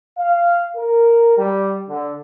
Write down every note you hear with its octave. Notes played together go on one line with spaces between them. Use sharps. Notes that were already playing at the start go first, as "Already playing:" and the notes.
F5
A#4
G3
D3